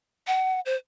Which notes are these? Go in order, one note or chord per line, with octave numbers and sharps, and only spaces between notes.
F#5
C5